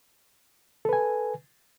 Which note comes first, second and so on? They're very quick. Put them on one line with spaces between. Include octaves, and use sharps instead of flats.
A4 B4 G#5